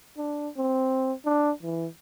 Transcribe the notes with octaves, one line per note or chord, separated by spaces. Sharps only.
D4
C4
D4
E3